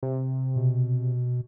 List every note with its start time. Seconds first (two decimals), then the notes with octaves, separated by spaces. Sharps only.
0.03 C3
0.56 B2